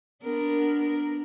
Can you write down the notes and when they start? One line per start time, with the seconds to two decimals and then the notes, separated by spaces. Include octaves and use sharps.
0.23 B3 D4 A#4